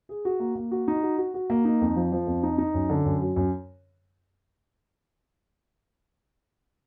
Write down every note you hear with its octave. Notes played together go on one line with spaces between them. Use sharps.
G#4
F#4
A#3
A#3
F#4
D#4
F#4
F#4
F#4
A#3
D#4
F2
F3
F3
F2
D#4
D#4
F#2
D3
F#2
F#3
F#2